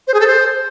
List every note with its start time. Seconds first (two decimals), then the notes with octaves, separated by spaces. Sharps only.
0.07 C5
0.14 G#4
0.20 A4
0.27 C5